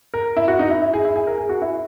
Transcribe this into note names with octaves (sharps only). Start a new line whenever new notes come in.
A#4
E4
F#4
D#4
E4
E4
G#4
E4
G#4
A#4
G#4
F#4
E4